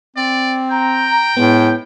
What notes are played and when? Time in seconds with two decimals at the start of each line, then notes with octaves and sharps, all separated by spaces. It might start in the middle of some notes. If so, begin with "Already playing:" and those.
0.16 C4 D5
0.71 G5 A#5
1.37 A2 G#3 B3